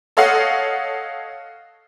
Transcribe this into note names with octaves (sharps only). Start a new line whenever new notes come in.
A4 C#5 D#5 F5 F#5